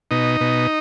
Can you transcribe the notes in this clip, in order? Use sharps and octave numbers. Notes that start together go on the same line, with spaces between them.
B2 D#4
B2